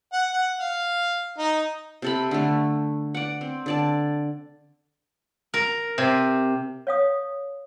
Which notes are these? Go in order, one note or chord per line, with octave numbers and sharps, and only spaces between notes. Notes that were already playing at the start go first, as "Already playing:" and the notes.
F#5
F#5
F5
D#4
C3 A4 B5
D3 A3
D5 F#5
C4
D3 D5 A5
A#4
C3
C#5 F5 D#6